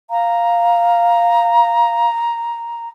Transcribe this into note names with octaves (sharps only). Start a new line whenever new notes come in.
F5 A#5